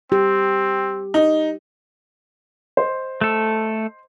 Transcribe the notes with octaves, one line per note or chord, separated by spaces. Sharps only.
C4 G4
D#4
C5 D#5
A3 A4